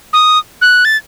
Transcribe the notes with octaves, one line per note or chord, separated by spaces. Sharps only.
D#6
F#6
A6